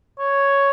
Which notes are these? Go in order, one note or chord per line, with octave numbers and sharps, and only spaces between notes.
C#5